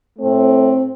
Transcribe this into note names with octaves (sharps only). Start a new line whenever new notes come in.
A2 A3 C4